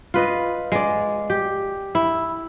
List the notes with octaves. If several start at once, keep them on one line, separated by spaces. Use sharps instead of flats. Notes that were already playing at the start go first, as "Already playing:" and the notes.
F4 B4 D#5
G#3 D5
G4
E4